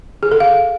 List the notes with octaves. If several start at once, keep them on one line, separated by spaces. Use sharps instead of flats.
G#4
A4
F5